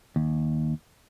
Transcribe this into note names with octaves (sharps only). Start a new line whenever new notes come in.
D#2